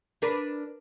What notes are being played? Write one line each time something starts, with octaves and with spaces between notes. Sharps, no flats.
D4 A#4 B4